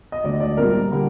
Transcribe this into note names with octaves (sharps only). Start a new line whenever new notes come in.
D#5
D2 D3 G#3 D5
D5
A#1 A#2 G3 A#4
D3 G3 A#3